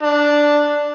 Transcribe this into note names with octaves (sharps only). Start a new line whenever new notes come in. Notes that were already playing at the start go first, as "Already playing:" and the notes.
D4